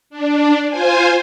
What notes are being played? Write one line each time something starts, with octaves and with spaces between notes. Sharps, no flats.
D4
F4 C5 G#5